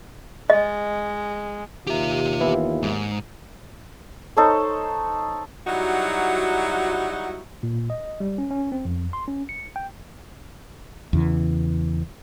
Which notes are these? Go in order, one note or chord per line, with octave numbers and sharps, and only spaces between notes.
G#3 D#5
D#2 F4 G4 E5
E3 B3 E4
G#2
D#4 A4 C5 C#5
F#3 G3 D#4 E4 F#4
A#2
D#5
G3
C#4
C#4
C4
F2
C6
C#4
C#7
G5
E2 C#3 E3